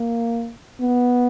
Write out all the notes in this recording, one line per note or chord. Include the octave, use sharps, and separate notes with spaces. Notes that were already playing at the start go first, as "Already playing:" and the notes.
Already playing: A#3
B3